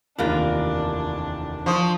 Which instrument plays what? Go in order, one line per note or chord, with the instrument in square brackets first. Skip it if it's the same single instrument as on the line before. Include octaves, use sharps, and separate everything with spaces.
[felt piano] F1 D#2 [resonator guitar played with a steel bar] E3 F4 A#4 [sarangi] D4
[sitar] F3 [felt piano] C6 C#6 D#6